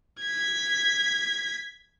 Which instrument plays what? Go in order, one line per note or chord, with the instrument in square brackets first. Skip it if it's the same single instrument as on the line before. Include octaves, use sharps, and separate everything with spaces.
[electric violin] G#6 B6